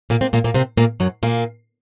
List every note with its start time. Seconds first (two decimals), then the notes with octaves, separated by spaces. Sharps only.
0.10 A#2 A#3
0.21 C3 C4
0.33 A#2 A#3
0.44 A#2 A#3
0.54 C3 C4
0.77 A#2 A#3
1.00 F#2 F#3
1.23 A#2 A#3